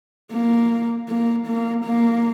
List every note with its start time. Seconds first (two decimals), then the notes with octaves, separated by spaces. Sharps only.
0.32 A#3
1.09 A#3
1.47 A#3
1.85 A#3